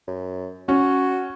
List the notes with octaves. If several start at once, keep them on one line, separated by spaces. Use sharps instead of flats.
F#2
C#4 F#4